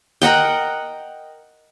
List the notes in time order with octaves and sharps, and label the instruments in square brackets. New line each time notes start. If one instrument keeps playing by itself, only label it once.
[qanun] A#4 D#5 F#5 G5